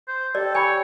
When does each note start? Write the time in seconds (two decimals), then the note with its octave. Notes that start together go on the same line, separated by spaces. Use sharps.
0.08 C5
0.35 G4 A4 D5
0.55 C#5 G#5 B5